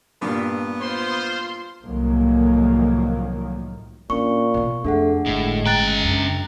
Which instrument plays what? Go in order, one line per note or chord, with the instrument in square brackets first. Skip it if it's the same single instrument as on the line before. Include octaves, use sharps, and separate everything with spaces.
[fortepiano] G2 A#2 [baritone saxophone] B3
[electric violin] F4 C6 [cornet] C5
[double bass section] C2 A2 D#3 F3 F#3 A#3
[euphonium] A#2 [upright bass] C#4 D4 [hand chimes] C#6
[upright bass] B2 B3
[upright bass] F2 [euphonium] A3 [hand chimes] D4 G#4 F#5
[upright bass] G1 [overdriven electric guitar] A2 [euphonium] G#3
[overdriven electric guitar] C#3 G5 [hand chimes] A#5 F#6 A6
[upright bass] F#2 D4